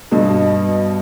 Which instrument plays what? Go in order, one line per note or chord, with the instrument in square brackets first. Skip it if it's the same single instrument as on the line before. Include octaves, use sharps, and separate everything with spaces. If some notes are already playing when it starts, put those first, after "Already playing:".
[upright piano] G2 B2